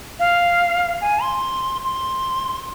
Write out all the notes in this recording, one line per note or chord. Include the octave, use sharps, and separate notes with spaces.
F5
G#5
C6
C6